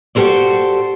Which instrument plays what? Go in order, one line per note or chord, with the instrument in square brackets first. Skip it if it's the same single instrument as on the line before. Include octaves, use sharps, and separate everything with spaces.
[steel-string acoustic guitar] F#4 G4 A4 A#4 C5 D5